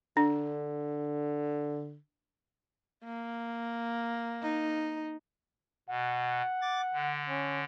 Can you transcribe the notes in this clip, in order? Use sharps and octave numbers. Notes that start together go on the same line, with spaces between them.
D3 D4
A#3
D#4
B2 F#5
D6 A6
D3
C#4